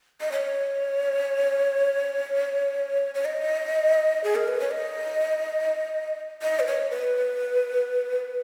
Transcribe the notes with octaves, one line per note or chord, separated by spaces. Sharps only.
D#5
C#5
C#5
D#5
G#4
A#4
B4
C#5
D#5
D#5
B4
C#5
B4